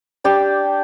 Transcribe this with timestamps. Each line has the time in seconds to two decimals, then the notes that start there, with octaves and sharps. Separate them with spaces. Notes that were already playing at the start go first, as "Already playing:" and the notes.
0.24 D4 G4 A5